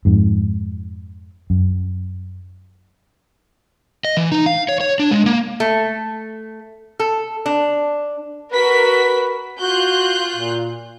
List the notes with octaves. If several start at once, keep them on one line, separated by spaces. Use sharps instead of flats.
F2 G#2
F#2
D#5
E3
D#4
F5
C#5
C#5
D4
G#3
A#3
A3
A4
D4
F#4 A#4 B4 B6
F4 F#4 F#6 G6
A#2